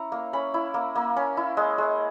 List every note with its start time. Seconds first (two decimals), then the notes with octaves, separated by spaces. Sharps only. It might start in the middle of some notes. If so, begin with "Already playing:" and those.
Already playing: C#4 E4 A#5
0.12 A#3
0.33 C#4 B5
0.54 E4
0.74 A#3
0.95 A#3
1.16 C#4
1.37 E4
1.57 G#3
1.78 G#3